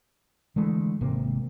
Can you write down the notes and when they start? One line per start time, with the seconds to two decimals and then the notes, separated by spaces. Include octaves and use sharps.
0.56 D3 E3 G#3 A3
1.01 G#1 C3 A#3